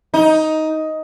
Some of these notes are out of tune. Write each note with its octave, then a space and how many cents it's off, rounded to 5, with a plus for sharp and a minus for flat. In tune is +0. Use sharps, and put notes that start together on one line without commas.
D#4 +10